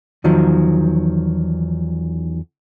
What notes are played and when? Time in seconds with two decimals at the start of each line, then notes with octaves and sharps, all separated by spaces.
0.24 E2 D#3 F3 F#3